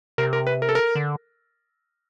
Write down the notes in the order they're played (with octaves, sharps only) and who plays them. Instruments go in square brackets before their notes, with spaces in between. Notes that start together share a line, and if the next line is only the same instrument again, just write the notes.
[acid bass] C3 [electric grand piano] A#4
[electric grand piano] A#4
B4
A#4
A4
A#4
[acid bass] D3